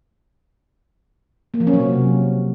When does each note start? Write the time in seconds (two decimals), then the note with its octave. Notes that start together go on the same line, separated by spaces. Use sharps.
1.54 A#3
1.60 F3
1.67 C#4
1.74 F#3
1.80 C3